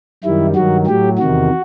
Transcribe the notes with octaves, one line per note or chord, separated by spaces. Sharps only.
F#2 D#3 G3 E4
G2 D#3 F#3 F#4
A2 F#3 G4
E2 C3 D#3 F#4